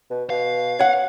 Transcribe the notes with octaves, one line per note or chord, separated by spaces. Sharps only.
B2
B2 F5
C#5 F#5